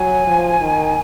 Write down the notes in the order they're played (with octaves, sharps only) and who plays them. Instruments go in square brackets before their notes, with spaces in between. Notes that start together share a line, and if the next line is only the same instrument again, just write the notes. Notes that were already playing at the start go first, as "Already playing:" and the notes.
Already playing: [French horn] F#3 [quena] G#5
[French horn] F3
D#3